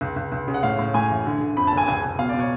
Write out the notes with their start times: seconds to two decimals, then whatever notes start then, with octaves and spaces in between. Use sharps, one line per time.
0.01 C#2
0.16 C#2
0.32 C#2
0.48 C#3
0.54 F#5
0.63 A2 F5
0.79 A2
0.94 A2 G#5
1.10 A1
1.26 D3
1.41 D3
1.57 F2 B5
1.67 A5
1.72 F#1
1.77 G#5
1.88 C#2 G#5
2.03 C#2
2.19 B2 F5
2.29 D5
2.34 B2
2.39 C#5